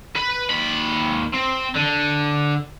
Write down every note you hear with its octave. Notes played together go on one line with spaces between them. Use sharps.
B4
D#2 B5
C4
D3